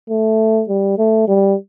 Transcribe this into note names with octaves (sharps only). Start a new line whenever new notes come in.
A3
G3
A3
G3